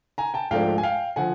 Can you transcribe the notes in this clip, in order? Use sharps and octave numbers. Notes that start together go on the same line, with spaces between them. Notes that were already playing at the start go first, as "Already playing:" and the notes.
G#5 A#5
G5 A5
G#2 F3 A3 D4 F5 G5
G#5
F5 G5
D3 F3 F#5 G#5